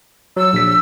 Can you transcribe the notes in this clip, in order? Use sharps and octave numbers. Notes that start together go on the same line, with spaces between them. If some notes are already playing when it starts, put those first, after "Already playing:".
F#3 E6
A#1 B6